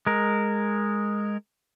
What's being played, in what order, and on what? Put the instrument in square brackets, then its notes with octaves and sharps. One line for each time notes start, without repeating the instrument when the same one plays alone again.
[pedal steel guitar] G#3 A#4